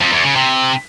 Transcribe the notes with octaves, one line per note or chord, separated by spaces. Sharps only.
F2
E2
C#3
C3